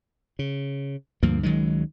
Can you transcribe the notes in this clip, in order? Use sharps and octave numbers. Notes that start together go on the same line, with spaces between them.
C#3
D2 G2 F3 A#3
C#2 D#3 F#3 G#3